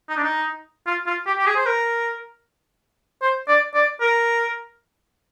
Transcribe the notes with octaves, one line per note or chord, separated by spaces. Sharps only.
D#4
D4
D#4
F4
F4
G4
G4
G#4
C5
A#4
C5
D5
D5
A#4